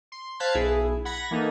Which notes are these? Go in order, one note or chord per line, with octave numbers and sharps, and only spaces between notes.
C6
C5 F5 A5 F#6 G#6 B6
B1 E4 G#4
F#5 B5 G#6 A#6
E3 A#3 D#4 A4